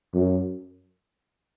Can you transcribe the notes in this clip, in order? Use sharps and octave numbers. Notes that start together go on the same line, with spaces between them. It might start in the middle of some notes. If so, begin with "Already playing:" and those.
F#2